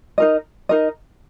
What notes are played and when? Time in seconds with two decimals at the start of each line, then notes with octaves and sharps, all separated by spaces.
0.18 D#4 A#4 D#5
0.69 D#4 A#4 D#5